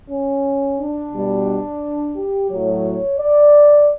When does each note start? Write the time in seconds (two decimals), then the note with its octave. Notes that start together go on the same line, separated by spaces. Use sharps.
0.10 C#4
0.79 D4
1.13 B2 G3
2.16 G4
2.51 A2 F#3 C#5
3.19 D5